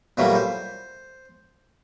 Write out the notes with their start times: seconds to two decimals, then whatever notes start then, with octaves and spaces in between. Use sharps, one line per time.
0.17 A#2 E3 F#3 G3 A3 A#3
0.35 C5